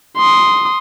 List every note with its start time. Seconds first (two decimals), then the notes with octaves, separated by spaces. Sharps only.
0.17 C6 D#6